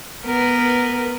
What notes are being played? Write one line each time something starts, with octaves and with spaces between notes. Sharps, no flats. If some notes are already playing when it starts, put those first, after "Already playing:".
B3 A#4 B4